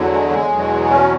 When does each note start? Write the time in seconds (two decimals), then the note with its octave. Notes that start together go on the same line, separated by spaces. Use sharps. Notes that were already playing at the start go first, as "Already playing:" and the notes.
Already playing: E2 D3 F#3
0.12 G#3
0.31 G#3
0.51 E2 B2 F#3
0.84 B3
0.90 C#4